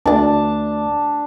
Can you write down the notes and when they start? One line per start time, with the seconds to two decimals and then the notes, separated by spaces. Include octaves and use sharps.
0.06 D2 D4 A5